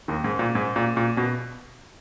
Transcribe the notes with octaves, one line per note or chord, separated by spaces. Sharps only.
D#2 D#3
G#2
A#2
G#2
A#2
A#2
B2